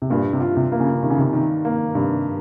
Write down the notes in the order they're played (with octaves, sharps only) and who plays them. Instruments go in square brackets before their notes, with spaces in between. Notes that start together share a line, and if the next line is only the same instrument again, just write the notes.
[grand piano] C3
[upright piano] G2 [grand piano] A#2
[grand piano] C3
[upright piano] F4
[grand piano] C3
[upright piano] A#3
[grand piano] C#3
[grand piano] C3 [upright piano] D#3
[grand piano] C#3
C3
[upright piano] D#3
A#3
[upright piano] G2 [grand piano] C3